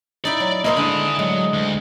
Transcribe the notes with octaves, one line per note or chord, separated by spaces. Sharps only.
D#4 E4 D5
F#3
A#3 E4 A#4 C5 C#5 D#5 C6 D#6
D3 G#3 G#5 B5
F#3 G#3
D2